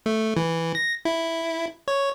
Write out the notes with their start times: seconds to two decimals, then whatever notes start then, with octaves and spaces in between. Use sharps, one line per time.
0.06 A3
0.37 E3
0.75 A#6
1.05 E4
1.88 C#5